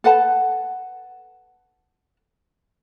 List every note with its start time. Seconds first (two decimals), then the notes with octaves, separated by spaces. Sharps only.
0.04 A4 B4 F#5 A5